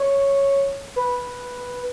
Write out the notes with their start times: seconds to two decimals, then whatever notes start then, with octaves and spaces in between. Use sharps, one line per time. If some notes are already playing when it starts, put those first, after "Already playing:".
Already playing: C#5
0.96 B4